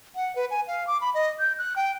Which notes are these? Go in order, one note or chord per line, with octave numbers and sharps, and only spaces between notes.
F#5
B4
G#5
F5
D6
B5
D#5
G6
F#6
G5